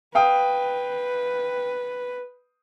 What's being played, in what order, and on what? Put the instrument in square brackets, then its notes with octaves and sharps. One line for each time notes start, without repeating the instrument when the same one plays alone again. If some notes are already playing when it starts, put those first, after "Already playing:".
[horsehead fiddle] B4 [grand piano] F5 G5 D#6